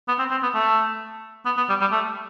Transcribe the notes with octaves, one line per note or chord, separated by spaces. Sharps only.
B3
C4
C4
B3
A3
B3
B3
G3
G3
A3